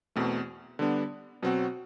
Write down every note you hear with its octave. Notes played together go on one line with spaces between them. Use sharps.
E2 B2 A3 C4
D3 G3 B3 D4
B2 F#3 C4 F#4